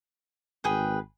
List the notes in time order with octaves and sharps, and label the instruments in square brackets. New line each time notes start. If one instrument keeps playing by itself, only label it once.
[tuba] G#1 [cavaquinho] G#4 B4 G5